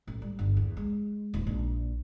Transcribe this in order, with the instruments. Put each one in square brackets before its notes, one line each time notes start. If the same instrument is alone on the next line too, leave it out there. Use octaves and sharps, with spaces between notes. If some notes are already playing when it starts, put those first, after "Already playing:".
[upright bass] A1
G3
G1
E2
G#3
D#1
A#1